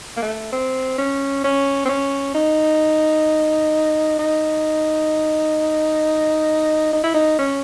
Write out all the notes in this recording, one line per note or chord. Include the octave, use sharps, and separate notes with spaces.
A#3
A3
C4
C#4
C#4
C4
C#4
D#4
D#4
D#4
E4
D#4
C#4